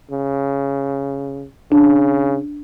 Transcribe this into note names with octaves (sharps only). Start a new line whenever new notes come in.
C#3
C#3 D4